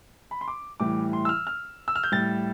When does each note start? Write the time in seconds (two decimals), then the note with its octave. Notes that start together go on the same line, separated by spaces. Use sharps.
0.31 B5
0.41 C6
0.48 D6
0.80 A2 E3 G3 D6
1.13 C6
1.25 E6
1.29 F6
1.47 F6
1.88 E6
1.95 F6
2.03 G6
2.12 A2 G3 A6